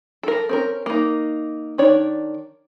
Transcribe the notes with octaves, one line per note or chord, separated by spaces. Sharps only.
A4 A#4
C4 C#4 A#4
A#3 D#4
D#3 D4 C#5 D5